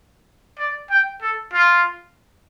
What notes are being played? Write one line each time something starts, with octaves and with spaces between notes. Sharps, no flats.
D5
G5
A4
F4